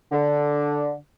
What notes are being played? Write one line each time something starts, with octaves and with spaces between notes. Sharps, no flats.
D3